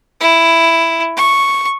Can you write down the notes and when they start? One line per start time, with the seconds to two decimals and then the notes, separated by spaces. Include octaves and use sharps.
0.21 E4
1.17 C#6